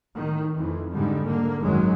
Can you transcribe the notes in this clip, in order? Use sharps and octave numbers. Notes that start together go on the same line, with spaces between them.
A2 D#3
F2 E3
G#2 D3 G3
D3 A#3
G#1 F#2 D#3 F#3 G#3